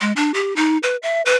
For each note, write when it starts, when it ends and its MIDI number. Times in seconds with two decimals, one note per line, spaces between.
0.01 0.12 56
0.16 0.32 62
0.34 0.55 67
0.56 0.78 63
0.83 0.96 71
1.02 1.22 76
1.25 1.36 71